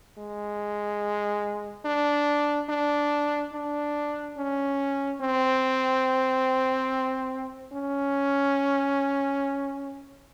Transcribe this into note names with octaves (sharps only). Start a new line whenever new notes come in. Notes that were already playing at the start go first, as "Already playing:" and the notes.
G#3
D4
D4
D4
C#4
C4
C#4